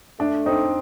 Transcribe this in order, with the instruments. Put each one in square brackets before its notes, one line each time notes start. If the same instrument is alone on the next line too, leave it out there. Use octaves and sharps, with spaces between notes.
[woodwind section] A3 [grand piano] D4
[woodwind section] C4 [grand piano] D#4